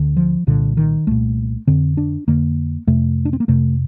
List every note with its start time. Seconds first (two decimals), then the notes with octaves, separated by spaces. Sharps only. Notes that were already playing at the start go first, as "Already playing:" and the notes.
Already playing: D2 D3
0.17 F3
0.47 C2 A#2 D3
0.77 D#3
1.07 C2 A#2 A3
1.67 F2 D3 C4
1.97 D4
2.28 F2 D3 A#3
2.87 F2 C3 A3
3.25 D4
3.33 C4
3.40 A#3
3.48 F2 C3 A3